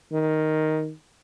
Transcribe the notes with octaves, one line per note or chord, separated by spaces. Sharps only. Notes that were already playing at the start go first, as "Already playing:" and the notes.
D#3